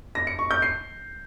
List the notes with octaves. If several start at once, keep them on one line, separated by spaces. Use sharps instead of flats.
A#6
C#7
C#6
G6
C7